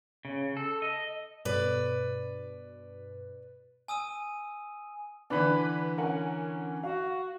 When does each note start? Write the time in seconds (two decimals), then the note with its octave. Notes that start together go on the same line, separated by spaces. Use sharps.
0.25 C#3
0.57 A4
0.82 D#5
1.45 G2 B2 B4 D5
3.88 G#5 D#6 E6 D#7
5.30 D3 E3 D4 B4
5.98 C#4 A#4 F#5 G#5
6.83 F#4 F5